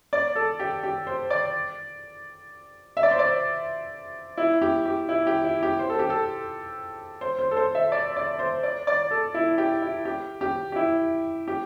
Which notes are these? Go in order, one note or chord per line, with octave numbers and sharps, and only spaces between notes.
D5
A4
G4
G4
C5
D5
E5
D5
C5
D5
E4
G4
G4
E4
G4
E4
G4
C5
A4
G4
A4
C5
C5
A4
C5
E5
D5
D5
C5
D5
D5
A4
E4
G4
E4
G4
G4
G4
E4
G4